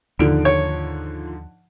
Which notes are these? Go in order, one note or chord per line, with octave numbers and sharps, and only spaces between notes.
D#2 G#2 D3 F3 D7
C#5